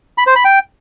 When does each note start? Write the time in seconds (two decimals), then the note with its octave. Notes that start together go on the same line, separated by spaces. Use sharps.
0.18 B5
0.27 C5
0.36 B5
0.45 G5